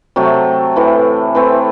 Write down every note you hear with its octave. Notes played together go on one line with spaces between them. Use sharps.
C3 F#3 A3
A2 E3 A3
E3 A3 C4